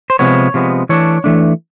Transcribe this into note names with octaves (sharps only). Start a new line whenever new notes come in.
C5
C3 F3 G#3 B3 C#5
C3 F3 G#3 B3
E3 A3 D4 C#5
E3 A3 D4